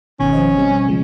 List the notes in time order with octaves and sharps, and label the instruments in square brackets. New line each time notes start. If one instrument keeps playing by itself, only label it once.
[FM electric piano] G#1 B2 D#3 [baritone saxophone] C#4
[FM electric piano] F3 C5 D#5
B2 G3 C4
C#3 F3 G#3